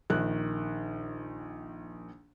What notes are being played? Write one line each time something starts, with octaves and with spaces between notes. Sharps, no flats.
A#1 D#3 F#6